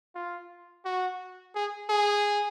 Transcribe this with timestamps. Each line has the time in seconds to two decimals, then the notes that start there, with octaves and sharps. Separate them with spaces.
0.15 F4
0.85 F#4
1.55 G#4
1.89 G#4